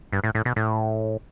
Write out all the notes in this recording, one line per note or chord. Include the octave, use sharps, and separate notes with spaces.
G2
A2
A2
B2
A2